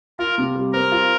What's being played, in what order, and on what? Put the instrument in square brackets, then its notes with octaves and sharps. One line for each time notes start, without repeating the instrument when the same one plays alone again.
[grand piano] F4 [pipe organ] A#4
[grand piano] C3
G3
[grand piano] C4 [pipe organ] A#4
[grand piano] F4